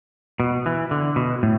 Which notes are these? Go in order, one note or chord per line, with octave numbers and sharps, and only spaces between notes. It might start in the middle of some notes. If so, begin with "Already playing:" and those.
B2
E3
D3
B2
A2